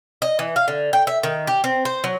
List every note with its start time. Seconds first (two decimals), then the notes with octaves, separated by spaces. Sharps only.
0.22 D#5
0.39 E3
0.56 F5
0.68 D3
0.93 G5
1.07 E5
1.23 D#3
1.47 G4
1.64 C4
1.85 C5
2.04 F#3